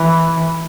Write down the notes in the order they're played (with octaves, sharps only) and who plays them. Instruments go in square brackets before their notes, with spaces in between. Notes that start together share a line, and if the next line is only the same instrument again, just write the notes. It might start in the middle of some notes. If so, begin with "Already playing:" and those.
Already playing: [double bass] E3